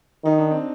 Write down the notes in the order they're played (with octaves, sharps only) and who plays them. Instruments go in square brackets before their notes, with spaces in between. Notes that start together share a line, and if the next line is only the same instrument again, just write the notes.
[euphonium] D#3 [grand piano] D#4
[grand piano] D4
C4